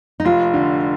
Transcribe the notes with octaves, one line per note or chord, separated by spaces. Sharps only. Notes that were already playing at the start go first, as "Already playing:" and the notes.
D#4
F1 F4
D3